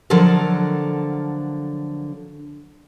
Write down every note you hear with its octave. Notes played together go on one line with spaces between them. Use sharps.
D3 F3 F#3 A4 A#4